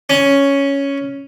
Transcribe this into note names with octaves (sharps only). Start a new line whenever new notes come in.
C#4